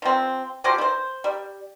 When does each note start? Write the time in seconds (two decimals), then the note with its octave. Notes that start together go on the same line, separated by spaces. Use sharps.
0.02 F3 C4
0.64 F3 F#3 G4 C5
0.78 E4 C5
1.24 G3